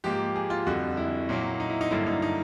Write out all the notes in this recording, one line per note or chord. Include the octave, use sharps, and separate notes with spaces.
G#2 F3 A#3 G4
G#4
F4
F2 D3 G3 F#4
E4
A#2 F#3 A#3
D#4
E4
D#4
G2 D3 F#3 A#3 E4
D#4
D#4